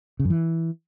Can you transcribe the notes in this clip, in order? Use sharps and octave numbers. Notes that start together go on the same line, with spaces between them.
C#3
F#2
E3